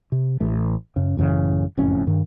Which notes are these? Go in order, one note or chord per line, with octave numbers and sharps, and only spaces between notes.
C3
A1 A3
F#2 C#3
A1 F#2 C#3 E3
F#1 F2 A2 C#4
G2 D#3